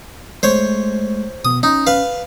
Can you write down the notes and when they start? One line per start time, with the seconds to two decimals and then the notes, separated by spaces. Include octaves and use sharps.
0.43 G#3 A3 C5 C#5
1.45 B2 B3 D#6
1.63 C#4 D#4
1.87 B4 F5